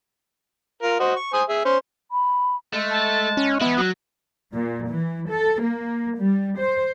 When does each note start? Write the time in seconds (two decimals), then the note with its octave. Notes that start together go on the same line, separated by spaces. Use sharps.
0.83 F4 A#4
1.00 F#4 C5 D#5
1.16 C#6
1.34 C5 G#5 D#6
1.49 G#4 E5
1.65 C#4 C5
2.11 B5
2.74 G#3 A3
2.90 A5
3.37 C#4
3.61 E3 B3 E4
3.79 F#3 F#6
4.53 A#2
4.87 E3
5.30 A4
5.63 A#3
6.18 G3
6.58 C5